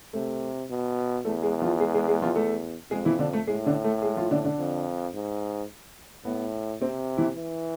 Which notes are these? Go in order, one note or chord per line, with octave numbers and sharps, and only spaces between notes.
C3 A3 A4
B2
E2 A3 A4
G#3 G#4
F3 F4
G#3 G#4
G#3 G#4
G#3 G#4
F3 F4
A3 A4
F2 G#3 G#4
E3 E4
D3 D4
A3 A4
A2 G#3 G#4
D3 D4
A3 A4
G#3 G#4
F3 F4
D3 D4
D3 D4
F2
G#2
A2 B3
C3 C4
E3 E4
E3